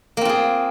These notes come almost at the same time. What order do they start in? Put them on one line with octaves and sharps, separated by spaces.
A#3 C4 F4 G#4